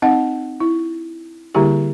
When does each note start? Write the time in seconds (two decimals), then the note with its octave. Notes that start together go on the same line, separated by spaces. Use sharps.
0.02 C4 D#4 D#5 F#5
0.60 E4
1.54 D3 G3 A#3 E4 G4 G#4